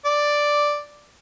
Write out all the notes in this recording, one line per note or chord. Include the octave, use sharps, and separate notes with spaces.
D5